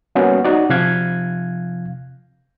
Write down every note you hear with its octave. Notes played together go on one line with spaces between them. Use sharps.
G3 A#3 B3 C#4 F#4
D#4 F#4 D5
C3 F3 F5 F#6 G#6